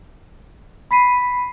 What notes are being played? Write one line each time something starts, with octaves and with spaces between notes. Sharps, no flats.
B5 B6 C7 D#7